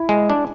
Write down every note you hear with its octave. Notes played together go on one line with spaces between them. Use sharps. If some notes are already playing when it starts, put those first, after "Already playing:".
Already playing: E4
G#3
D4